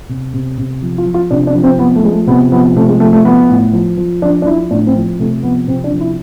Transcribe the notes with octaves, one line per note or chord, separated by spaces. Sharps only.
C3
C3
C3
F3
F4
F3
F4
C3 D4
D4
F3
C4
F3 B3
A3
F3 G#3
A3
C3 B3
F3 B3
C3 A3
G#3
F3 A3
A3
F3 B3
A2
F3
F3
F3 D4
D4
F3 E4
A2 D4
C4
F3
C3 A3
F3 B3
C3 C4
D4
F3
E4